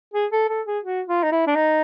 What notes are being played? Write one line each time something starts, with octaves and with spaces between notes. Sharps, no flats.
G#4
A4
A4
G#4
F#4
F4
D#4
E4
D4
D#4